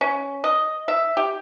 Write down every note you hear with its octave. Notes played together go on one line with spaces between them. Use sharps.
C#4
D#5
E5
G4